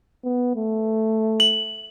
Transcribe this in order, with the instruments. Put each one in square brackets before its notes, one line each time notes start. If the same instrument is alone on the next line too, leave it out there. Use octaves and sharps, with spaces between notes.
[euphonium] B3
A3
[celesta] F#7